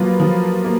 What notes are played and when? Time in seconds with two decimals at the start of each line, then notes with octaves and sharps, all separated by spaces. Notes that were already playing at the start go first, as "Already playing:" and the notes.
Already playing: F3 F#3 A#3 F4 B4
0.20 F3
0.64 A#3